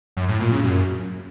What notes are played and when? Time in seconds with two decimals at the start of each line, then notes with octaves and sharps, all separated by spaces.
0.17 F#2
0.28 A2
0.40 A#2
0.52 C#3
0.64 F#2